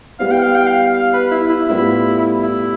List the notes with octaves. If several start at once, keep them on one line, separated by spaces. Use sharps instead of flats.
G3 B3 E4 F5
G5
F5
G5
F5
F5
B4
E4
E4
A2 G3 B3 E4 F4
E4